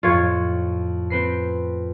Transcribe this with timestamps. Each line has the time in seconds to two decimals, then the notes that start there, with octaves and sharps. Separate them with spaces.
0.03 F2 A2 F4 C#5
1.10 C4 B4 C7